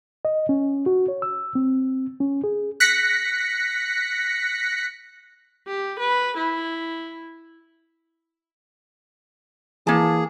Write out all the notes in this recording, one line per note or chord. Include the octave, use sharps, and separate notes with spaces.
D#5
C#4
F#4
C#5
E6
C4
C#4
G#4
F#6 A#6 B6 C#7
G4
B4
E4
E3 A#3 G#4 A5